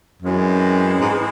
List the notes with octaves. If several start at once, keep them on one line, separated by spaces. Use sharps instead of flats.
F#2 E3 G#3 C4
G#2